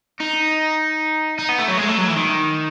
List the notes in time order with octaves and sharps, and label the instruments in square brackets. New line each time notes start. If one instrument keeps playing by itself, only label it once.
[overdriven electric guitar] D#4
D#4
B3
A3
F#3
G#3
A3
F#3
E3
D#3